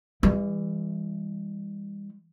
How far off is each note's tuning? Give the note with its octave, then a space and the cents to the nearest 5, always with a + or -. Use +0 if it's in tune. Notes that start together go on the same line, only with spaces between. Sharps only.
E3 +0 G3 +40